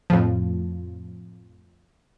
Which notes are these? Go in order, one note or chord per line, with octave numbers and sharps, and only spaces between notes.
F2 A2 F3